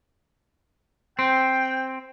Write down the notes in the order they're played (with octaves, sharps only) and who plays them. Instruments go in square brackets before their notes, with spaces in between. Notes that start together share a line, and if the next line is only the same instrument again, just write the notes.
[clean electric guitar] C4 [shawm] G5